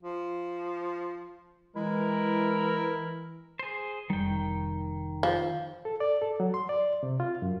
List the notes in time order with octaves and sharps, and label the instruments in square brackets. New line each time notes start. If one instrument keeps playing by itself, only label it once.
[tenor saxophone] F3
[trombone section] E3 [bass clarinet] G#3 [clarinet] E4 [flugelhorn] A#4
[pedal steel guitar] G#4 C5
[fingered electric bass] F1 G3 [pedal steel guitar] D#3 G5
[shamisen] F3
[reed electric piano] A4
D5
A4
F#3
C6
D5
C3
F4
F#2